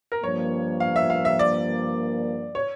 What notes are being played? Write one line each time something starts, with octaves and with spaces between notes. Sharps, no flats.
A#4
G2 F3 A#3 C#5
F5
E5
F5
E5
D5
C#5